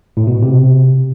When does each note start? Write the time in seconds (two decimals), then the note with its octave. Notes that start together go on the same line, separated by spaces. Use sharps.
0.17 A2
0.27 B2
0.42 C3